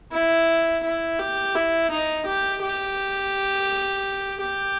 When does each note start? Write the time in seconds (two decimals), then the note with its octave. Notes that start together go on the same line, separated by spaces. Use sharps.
0.12 E4
0.83 E4
1.19 G4
1.55 E4
1.91 D#4
2.26 G4
2.62 G4
4.41 G4